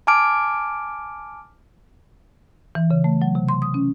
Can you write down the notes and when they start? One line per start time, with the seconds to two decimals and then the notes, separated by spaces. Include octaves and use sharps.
0.07 G#5 A5 D6 F6 D7
2.75 E3
2.91 C#3
3.04 A3
3.22 F#3
3.35 C3
3.49 C6
3.62 D#6
3.74 C#4